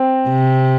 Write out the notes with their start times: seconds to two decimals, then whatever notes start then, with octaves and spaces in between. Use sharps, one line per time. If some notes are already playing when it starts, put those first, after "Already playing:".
Already playing: C4
0.28 C3